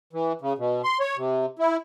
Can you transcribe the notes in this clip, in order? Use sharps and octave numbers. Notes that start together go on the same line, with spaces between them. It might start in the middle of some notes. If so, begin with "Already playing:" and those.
E3
C#3
B2
C6
C#5
C3
E4